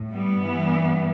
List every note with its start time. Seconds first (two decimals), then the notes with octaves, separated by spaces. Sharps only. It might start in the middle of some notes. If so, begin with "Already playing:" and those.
Already playing: A2
0.10 G3 B3
0.42 G2 E3 G3